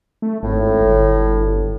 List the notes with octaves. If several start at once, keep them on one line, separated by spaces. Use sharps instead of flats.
A3
G#1 A2
G1